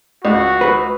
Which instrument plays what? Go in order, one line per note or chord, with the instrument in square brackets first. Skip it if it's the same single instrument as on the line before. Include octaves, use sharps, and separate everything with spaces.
[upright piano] C#2 [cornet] F#4
[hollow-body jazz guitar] B4